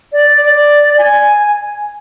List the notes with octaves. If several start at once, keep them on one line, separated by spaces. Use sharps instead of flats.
D5
D5
G#5